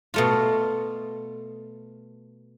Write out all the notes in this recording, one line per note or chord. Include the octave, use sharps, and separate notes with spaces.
B2 A3 F4